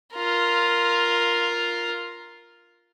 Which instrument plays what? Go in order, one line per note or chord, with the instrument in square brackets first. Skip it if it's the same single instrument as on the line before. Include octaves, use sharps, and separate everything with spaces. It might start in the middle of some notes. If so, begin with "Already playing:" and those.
[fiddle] F4 A#4